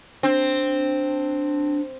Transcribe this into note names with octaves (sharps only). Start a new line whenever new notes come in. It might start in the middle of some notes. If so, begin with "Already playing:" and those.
C4 D4